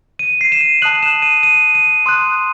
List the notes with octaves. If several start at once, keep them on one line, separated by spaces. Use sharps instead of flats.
D#7
C7
E7
D#7
A5 D#6 F#6 F#7
E7
D#7
D#7
D#7
C6 D#6 F#6